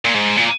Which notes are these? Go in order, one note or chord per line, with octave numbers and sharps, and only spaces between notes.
A#2
G#2
A#2